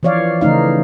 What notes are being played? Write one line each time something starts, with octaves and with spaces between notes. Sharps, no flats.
E3 F3 C#5 D5 F5
C#3 E3 A3 D#4 F5